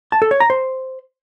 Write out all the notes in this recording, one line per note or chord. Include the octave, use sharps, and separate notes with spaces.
A5
A4
C#5
A#5
C5